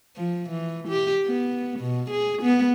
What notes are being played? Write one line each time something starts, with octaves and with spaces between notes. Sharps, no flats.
F3
E3
G4
B3
B2
G#4
B3